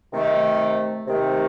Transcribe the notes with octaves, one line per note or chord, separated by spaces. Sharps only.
C3 D#3 A3
C3 D#3 A3